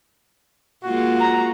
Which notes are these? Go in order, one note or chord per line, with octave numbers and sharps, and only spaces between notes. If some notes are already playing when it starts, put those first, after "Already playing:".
G#3 A#3 F4 F#4
A#5